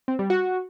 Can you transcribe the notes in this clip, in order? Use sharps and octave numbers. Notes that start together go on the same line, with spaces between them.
C4
G3
F#4